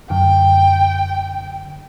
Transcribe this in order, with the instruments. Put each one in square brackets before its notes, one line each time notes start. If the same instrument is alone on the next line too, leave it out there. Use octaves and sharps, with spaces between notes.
[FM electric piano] F#2 D3 [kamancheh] G5